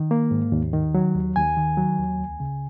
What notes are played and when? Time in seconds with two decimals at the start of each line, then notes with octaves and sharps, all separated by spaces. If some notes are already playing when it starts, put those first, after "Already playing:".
Already playing: D#3
0.11 A#3
0.31 G#2
0.52 D#2
0.73 D#3
0.94 F#3
1.15 D#2
1.36 D#2 G#5
1.57 D#3
1.77 F#3
1.99 D#2
2.19 C#2
2.40 C#3